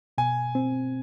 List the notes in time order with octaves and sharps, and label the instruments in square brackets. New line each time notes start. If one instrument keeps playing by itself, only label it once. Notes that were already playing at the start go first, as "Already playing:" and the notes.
[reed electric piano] B2 [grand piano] G#5
[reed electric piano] C4